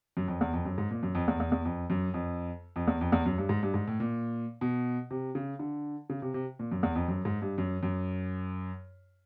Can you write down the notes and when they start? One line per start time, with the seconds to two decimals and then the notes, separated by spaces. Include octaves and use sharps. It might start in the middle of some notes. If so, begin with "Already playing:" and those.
0.17 F#2
0.28 F2
0.41 E2
0.53 F2
0.65 F#2
0.78 G#2
0.91 A#2
1.03 F#2
1.15 F2
1.28 E2
1.40 E2
1.52 E2
1.65 F2
1.90 F#2
2.14 F2
2.76 F2
2.87 E2
3.01 F2
3.12 E2
3.26 F#2
3.38 G2
3.49 G#2
3.63 G2
3.74 G#2
3.87 A2
4.00 A#2
4.61 B2
5.11 C3
5.35 C#3
5.59 D3
6.10 C#3
6.22 C3
6.34 C3
6.59 A#2
6.72 F#2
6.83 E2
6.95 F2
7.08 F#2
7.25 G#2
7.42 G2
7.58 F#2
7.83 F#2